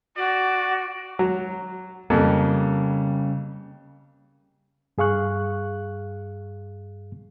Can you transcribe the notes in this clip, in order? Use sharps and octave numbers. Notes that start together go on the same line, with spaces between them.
F#4 D5
F#3
F2 C#3 G3 A#3
G2 G#4 F5 C#6 F#6